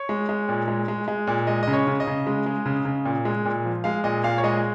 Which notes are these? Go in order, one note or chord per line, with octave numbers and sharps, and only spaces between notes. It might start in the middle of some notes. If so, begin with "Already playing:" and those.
Already playing: C#5
G#3
G#3
A#2
G#3
G#3
G#3
A#2
G#3 D#5
C#3 D#5
C#5
C#3
D#5
C#3
G#3
G#3
C#3
C#3
A#2
G#3
A#2
F3
G#3 F5
A#2 D#5
A#2 F5
C#5
G#3 D#5